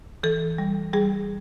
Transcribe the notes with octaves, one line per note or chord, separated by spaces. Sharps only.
E3 A4
G3
G3 G#4